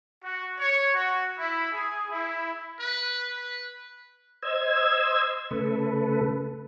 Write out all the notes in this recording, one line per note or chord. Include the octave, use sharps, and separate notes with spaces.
F#4
C#5
F#4
E4
G#4
E4
B4
B4
C5 D#5 E6 G#6
C#3 A3 A4 B4